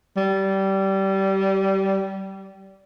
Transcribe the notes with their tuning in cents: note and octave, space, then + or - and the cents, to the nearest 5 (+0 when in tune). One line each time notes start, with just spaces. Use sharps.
G3 -20